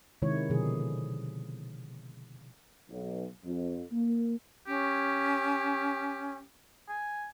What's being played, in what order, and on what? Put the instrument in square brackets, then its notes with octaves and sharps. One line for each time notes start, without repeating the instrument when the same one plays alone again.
[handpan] C3 D#3 G#3 E4 C#5
B2 D3 F3 G#4
[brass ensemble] B1
F2
A#3
[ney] C#4 [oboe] G4
[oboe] G#5